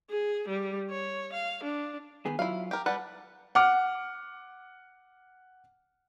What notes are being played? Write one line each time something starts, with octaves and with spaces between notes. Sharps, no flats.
G#4
G3
C#5
F5
D4
D#3 B3 G#4
F#3 E4 F4 F5
G4 A#4
G3 B4 F#5 A5
F#5 D6 F6